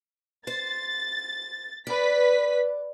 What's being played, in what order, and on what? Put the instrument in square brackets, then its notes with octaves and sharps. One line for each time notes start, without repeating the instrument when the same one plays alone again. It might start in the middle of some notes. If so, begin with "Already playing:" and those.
[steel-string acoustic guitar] C5 [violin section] A6
[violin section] B4 B6 [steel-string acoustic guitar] D5